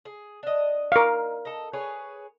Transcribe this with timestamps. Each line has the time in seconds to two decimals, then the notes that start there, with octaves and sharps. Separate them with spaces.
0.05 G#4
0.43 D4 D#5
0.92 A#4 F5
1.45 A4 D#5
1.73 G#4 B4 C#5